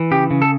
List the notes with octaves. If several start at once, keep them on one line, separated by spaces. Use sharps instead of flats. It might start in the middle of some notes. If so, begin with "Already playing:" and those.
Already playing: E3
C#3 G4
C#3
A4